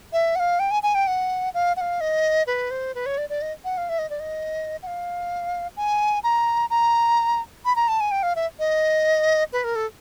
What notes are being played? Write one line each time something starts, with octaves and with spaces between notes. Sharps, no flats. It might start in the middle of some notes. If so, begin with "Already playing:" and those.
E5
F#5
F5
G5
G#5
G#5
G5
F#5
F5
F#5
F5
D#5
B4
C5
B4
C#5
D5
D5
D#5
F#5
F5
E5
D#5
D5
D#5
F#5
F5
G#5
A#5
A#5
B5
A#5
A5
G#5
G5
F5
E5
D#5
B4
A#4
A4